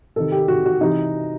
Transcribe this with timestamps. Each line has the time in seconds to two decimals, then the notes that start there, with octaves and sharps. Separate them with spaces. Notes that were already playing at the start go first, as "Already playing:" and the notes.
0.16 C3 D#3 A4
0.32 G4
0.48 D#3 F#4
0.54 C3
0.66 F#4
0.81 C3 E3 D#4